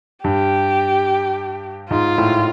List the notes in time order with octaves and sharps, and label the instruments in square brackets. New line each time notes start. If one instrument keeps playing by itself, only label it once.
[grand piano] G2 [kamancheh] G4
[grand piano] G#2 [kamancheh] F4
[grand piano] A2